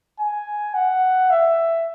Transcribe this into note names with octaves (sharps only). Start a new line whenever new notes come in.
G#5
F#5
E5